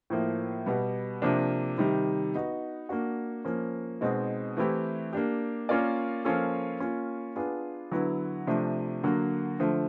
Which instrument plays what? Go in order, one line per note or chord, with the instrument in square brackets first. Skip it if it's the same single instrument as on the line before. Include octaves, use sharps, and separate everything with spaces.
[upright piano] A2 F3 A#3
B2 G3 B3
C3 F3 A#3 D4
C3 D#3 G3
B3 D#4 F#4
A#3 D4 F#4
F3 A#3 C#4
B2 G#3 C4 D#4
E3 A3 C4 E4 G4
A#3 D4 G4
A#3 C#4 F4 A#4 D5
F3 A#3 C#4 F4 A4
A#3 C#4 F4
B3 D4 F4 G#4
D3 F#3 B3 E4
C3 F3 A3 D4
D3 F#3 A#3
D3 F3 A3